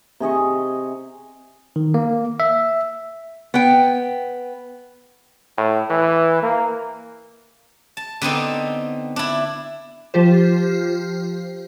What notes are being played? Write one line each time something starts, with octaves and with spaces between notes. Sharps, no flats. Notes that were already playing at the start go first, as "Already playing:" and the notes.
C3 G#4 D#5 C#6
D#3
A#3
E5
B3 G5
A2
E3
A#3
A5
D3 B3 C4 D#4
D4 E4
F3 F4 G4 C5